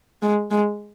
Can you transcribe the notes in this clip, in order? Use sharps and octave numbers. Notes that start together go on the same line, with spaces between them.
G#3
G#3